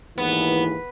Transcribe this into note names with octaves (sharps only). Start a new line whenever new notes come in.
D#2 G#2 E3 B3